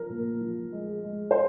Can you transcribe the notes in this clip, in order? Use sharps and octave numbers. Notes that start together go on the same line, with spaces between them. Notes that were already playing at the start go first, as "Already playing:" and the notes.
Already playing: F3 A#4
A#2
F3
G#3
G#3
C5